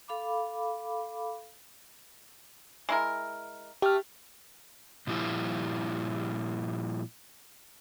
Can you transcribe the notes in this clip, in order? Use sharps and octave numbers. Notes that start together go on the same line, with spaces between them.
A4 F5 B5 D6
G#3 E4 A#4
A3 G4 F6
A#2 F3 G3 E4 F4